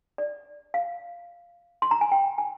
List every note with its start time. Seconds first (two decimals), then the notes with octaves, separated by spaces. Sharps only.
0.18 D5
0.74 F5
1.82 C6
1.91 A#5
2.01 G#5
2.12 G5
2.38 G#5